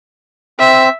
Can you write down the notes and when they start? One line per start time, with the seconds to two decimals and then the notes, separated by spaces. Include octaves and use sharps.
0.59 C4 E5